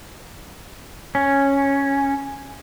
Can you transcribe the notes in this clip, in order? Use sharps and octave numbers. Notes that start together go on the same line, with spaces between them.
C#4